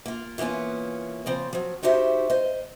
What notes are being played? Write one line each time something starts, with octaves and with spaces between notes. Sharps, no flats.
A#3 F4
E3 A#3 B3 C#4 F4
C#3 F3 C4
F3 F#3
D#4 F#4 G4 C5 E5
C5 D#5